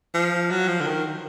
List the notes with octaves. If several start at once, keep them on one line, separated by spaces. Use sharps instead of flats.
F3
F#3
F3
D3
D#3